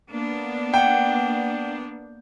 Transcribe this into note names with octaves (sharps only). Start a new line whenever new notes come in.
A#3 B3 D4
F#5 G5